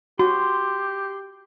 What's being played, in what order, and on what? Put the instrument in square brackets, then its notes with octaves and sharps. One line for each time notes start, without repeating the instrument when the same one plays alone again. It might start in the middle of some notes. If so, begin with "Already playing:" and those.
[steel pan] F#4 [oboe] G4 [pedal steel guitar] C6